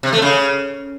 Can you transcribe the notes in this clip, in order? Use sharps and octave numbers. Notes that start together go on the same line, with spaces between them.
C3
A3
C#3